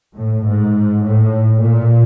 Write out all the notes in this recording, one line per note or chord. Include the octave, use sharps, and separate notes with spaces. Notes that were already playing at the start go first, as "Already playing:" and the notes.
A2
G#2
A2
A#2